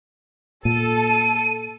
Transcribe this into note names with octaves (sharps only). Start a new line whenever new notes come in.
A#2 A4 D#7